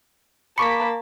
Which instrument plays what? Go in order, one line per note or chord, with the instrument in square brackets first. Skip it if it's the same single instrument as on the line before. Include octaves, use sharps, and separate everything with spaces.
[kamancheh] A#3 A5 [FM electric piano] B5 D6 B6 [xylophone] C#6 C#7